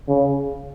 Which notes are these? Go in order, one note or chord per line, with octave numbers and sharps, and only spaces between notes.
C#3